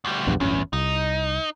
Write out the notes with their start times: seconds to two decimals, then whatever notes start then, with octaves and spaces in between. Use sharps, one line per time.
0.05 D2 G3
0.27 A#1 E2 G2
0.40 D1 G1 E2 C#4
0.73 C2 D#4